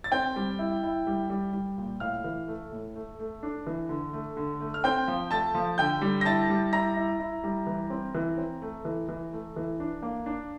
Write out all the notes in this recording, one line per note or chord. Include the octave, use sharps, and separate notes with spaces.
A6
C4 G5 G6
G3
E4
E4
G3
G3
G3
A#2
A2 F5 F6
E3
A3
A2
A3
A3
D4
E3
D3
A3
D3
A3
F6
C4 G5 G6
F3
A3 A5 A6
F3
D3 G5 G6
G3
A#6
E4 A5 A6
G3
E4 A#5 A#6
E4
E4
G3
E3
C4
E3
C4
A3
E3
E3
A3
E3
D4
A#3
D4